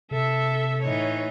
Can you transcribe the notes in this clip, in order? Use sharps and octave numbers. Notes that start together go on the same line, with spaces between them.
C3 A4 E5
A2 E3 D#4 C#5